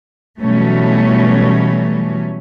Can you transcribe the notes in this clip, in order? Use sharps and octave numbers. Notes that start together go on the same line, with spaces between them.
B2 E3 F#3 G3 A3 C#4